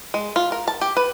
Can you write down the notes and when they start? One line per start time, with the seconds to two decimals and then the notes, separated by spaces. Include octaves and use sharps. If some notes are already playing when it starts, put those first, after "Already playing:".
0.14 G#3
0.36 F4
0.52 A#4
0.68 A5
0.81 G4
0.97 B4